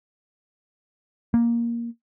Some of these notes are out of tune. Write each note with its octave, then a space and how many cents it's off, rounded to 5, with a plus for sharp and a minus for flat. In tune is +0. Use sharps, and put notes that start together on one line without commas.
A#3 +10